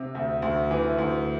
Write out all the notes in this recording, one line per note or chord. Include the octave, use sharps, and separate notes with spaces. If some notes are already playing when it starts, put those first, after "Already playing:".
Already playing: C3
D2
D2
E3
D2